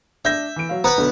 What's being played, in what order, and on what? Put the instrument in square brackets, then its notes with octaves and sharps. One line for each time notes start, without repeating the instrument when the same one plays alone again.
[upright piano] D4 G6 A#6 [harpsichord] E5
[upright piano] E3 D7
F#3 F5
[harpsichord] B3 B4 [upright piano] A#5
[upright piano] B1 D3